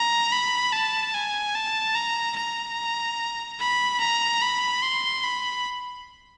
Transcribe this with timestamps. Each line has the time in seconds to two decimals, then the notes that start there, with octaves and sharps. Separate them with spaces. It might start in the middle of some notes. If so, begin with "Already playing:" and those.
Already playing: A#5
0.32 B5
0.73 A5
1.14 G#5
1.55 A5
1.95 A#5
2.37 A#5
3.60 B5
4.00 A#5
4.41 B5
4.83 C6
5.24 B5